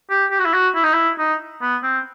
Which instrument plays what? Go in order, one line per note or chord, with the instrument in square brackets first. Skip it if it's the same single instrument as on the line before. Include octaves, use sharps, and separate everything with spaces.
[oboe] G4
G4
F#4
E4
F#4
E4
D#4
E4
D#4
B3
C4